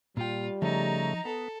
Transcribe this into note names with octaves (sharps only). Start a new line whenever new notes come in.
A#2 G3 F4 G5
C#3 F3 A3 D#4 A#5
B3 A4